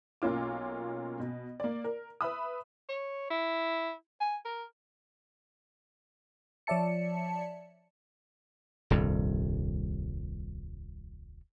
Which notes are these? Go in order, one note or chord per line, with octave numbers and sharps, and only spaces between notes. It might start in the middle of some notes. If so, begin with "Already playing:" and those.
B1 A#3 C#4 F4 D6
B2
A#3 D5
A#4
B4 E5 B5 D#6
C#5
E4
G#5
A#4
F3 C#5 D5 E5 A5 C#7
D#1 C2 G2